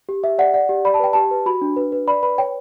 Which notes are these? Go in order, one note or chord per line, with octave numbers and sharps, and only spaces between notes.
G4
G4 E5
D5 F#5
D5 F#5
G4
D5 B5
A5
B4 G5
G4 A5
B4
F#4 B5
D4
B4
B4
D5 B5
B4 B5
C#5 G5